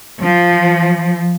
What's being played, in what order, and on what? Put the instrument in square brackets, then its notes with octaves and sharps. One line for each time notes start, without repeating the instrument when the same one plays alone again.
[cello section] F3